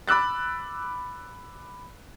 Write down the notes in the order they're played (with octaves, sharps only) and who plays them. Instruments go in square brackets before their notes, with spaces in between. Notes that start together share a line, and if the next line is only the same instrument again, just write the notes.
[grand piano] B5 D6 E6 F#6 A6